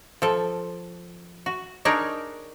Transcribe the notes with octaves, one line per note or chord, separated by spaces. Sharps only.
F3 A4
F#4
D4 D#4 G#4 A#4 C#5